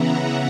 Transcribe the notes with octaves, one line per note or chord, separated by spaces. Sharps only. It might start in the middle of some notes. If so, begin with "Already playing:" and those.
Already playing: C#3 E3 B3 E4 F#5 A#5